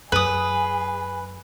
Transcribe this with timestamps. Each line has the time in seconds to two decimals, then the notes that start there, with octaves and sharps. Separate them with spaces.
0.12 F#2 G#4 B4 D#6